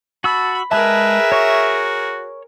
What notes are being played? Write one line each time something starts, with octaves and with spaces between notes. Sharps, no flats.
F#4 A5 B5 E6
G#3 G#4 A#4 B4 E5 A5
F#4 C#5 C#6